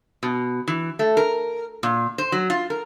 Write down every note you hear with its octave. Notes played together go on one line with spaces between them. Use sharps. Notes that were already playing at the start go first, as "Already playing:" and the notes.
B2
E3
A3
A#4
A#2
C5
F#3
F4
A#4